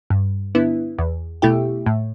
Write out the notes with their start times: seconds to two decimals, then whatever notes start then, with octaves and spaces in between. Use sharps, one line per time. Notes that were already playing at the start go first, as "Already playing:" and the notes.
0.10 G2
0.55 D3 B3 E4
0.98 E2
1.42 B2 A3 E4 G4
1.86 A2